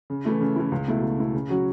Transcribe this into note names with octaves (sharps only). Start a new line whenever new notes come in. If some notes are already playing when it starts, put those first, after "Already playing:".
C#3
E3 A3 E4
C#3
E3 A3 E4
C#2
B2 A3 E4
C#2
B2 A3 E4
C#3
F#3 C#4 F#4